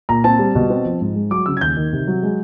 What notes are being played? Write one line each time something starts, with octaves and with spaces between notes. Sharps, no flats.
A#2 A#5
C4 A5
G3
B2
C4
F3
G#2
G#3
F#3 D6
C#3 E6
G#6
D#2 G6
D#3
C3
F#3
G#3